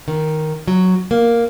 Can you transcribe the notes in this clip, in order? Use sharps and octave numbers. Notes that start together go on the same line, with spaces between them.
D#3
F#3
A#3